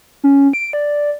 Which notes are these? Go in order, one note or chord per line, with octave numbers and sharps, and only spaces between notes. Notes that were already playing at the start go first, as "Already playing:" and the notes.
C#4
D7
D5